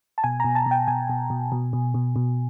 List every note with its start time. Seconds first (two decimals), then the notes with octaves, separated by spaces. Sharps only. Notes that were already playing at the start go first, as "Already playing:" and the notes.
0.18 A5
0.24 B2 G#5
0.40 B2 A#5
0.55 A5
0.66 B2 G5
0.88 B2 G#5
1.10 B2
1.30 B2
1.52 B2
1.73 B2
1.94 B2
2.16 B2